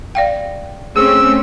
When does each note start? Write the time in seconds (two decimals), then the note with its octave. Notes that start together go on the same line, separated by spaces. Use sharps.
0.15 D5 F5 G5
0.96 A3 C4 C#4 G#4 E6